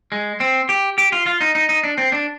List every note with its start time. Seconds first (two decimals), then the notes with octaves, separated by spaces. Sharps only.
0.12 G#3
0.40 C4
0.69 G4
0.98 G4
1.12 F4
1.26 F4
1.41 D#4
1.55 D#4
1.69 D#4
1.83 D4
1.98 C4
2.12 D4